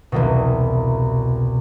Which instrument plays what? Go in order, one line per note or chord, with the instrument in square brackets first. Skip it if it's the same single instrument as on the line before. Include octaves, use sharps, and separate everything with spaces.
[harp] E1 C2 B2